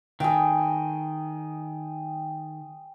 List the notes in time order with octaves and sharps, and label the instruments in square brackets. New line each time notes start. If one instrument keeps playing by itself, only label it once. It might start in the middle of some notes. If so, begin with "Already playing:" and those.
[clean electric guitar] D#3 [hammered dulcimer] G#4 G5